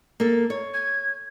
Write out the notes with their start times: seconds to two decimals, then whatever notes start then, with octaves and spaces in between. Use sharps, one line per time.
0.20 A#3 A4
0.50 C#5
0.73 G#6